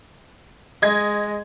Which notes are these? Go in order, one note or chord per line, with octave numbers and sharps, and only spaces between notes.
G#3 D#5 G#6